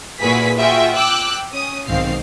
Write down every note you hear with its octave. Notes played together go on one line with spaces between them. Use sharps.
A#2 E4 F#4 G#4 B4 B6
F4 F#4 G#4 E5 G5
G5 D6 E6 F#6
C#4 D#6
B1 G#2 D#3 C4 F5 C7